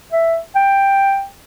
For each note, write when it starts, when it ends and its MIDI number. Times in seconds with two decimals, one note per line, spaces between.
0.13 0.38 76
0.55 1.26 79